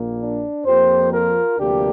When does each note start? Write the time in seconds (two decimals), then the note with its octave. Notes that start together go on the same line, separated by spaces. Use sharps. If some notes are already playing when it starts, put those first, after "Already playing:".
Already playing: A#1 A#2 A#3
0.20 D4
0.66 F2 F3 A#3 G4 C5
1.12 F4 A#4
1.59 D2 C3 F3 A#3 D4 G4